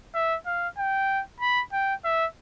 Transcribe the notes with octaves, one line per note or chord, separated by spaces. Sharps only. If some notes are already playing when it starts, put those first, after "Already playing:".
E5
F5
G5
B5
G5
E5